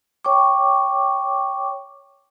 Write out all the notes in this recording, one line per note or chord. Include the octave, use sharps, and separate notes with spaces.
C#5 G5 C#6 D6